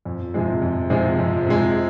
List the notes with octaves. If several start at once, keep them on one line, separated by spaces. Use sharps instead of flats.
F2
C3 F3 G#3
F2
C3 F3 G#3
F2
C3 F3 G#3